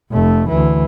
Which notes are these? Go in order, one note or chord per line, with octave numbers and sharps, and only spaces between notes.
F1 A3
D2 E3